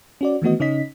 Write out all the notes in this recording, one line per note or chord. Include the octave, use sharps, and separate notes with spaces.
C#4 F#4 D5
D#3 E3 A3 B3 F#4 D#5
C#3 C#4 D#4 D#5 B6